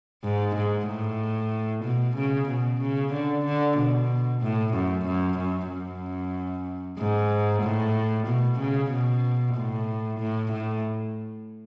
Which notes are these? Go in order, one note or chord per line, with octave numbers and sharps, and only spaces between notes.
G#2
G#2
A2
B2
C#3
B2
C#3
D3
D3
B2
A2
F#2
F#2
F#2
F#2
G#2
A2
B2
C#3
B2
A2
A2
A2